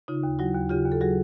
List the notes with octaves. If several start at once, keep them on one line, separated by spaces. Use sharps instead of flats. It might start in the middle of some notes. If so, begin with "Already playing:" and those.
C#3 D#4 F4
D#2
F#3 E4 F#4
D#2
C#3 F4 G4
D#2
A4
F#3 F#4 G#4